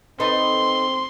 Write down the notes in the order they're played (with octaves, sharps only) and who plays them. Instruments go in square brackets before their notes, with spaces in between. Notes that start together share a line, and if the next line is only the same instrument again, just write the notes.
[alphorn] C4 [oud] D#4 A4 B4 [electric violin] C6